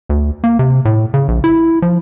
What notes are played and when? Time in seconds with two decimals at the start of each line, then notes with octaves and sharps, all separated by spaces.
0.09 D2
0.44 A#3
0.59 C3
0.85 A2
1.14 C#3
1.28 A#1
1.44 E4
1.82 F3